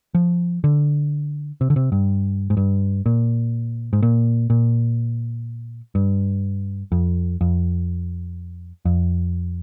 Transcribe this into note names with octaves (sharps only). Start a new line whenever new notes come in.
F3
D3
C3
D3
C3
G2
G#2
G2
A#2
G#2
A#2
A#2
G2
F2
F2
F2